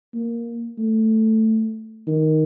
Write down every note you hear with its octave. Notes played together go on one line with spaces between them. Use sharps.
A#3
A3
D#3